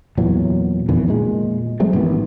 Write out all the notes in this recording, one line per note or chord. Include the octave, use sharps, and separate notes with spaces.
E2 A#2 E3 F#3
F2 B2 D#3 E3
A#2 G#3
F#3 G#3 A3 C4
A1 G#2 D#3 B3